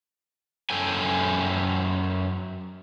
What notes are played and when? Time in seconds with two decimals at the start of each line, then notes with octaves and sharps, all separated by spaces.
0.70 F#2 A4 G5 G#5